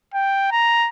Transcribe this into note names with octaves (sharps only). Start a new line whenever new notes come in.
G5
A#5